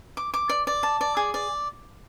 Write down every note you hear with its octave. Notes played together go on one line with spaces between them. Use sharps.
D6
D6
D5
D5
A5
D5
G#4
D5